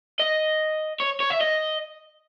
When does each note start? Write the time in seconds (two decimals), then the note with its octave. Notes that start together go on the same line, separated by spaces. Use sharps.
0.20 D#5
1.00 C#5
1.20 C#5
1.30 E5
1.41 D#5